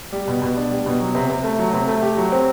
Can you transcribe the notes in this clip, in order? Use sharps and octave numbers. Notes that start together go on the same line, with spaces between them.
G3
B2
B2
D4
G3
B2
F#3
C3
C3
A3
F#3
C3
A3
G4
F#3
C4